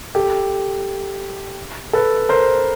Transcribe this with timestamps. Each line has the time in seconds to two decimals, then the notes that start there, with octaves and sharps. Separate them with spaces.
0.15 G4 A4
1.93 A4 B4
2.29 A#4 C5